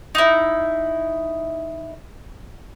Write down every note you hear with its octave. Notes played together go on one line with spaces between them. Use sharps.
D#4 E4